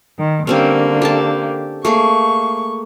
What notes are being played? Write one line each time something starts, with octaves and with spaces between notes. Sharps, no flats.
D#3
D3 G3 A#3 C4 C#4
G4 A4 A5
A3 A#3 G#4 C#6